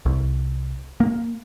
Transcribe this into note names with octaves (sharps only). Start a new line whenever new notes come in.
C2
A#3